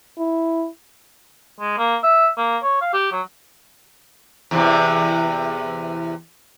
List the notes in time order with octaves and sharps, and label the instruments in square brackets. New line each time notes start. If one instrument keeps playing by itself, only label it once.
[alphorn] E4
[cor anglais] G#3
A#3
E5
A#3
C#5
F5
G4
F#3
[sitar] E2 C3 E3